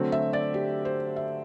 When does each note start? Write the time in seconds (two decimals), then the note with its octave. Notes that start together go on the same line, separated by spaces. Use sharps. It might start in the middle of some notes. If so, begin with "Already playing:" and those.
Already playing: D3 F#3 A3 C4
0.12 E5
0.33 D5
0.54 G4
0.85 C5
1.16 E5